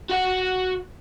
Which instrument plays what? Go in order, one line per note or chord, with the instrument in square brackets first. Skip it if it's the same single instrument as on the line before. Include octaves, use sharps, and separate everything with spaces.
[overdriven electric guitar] F#4 F#5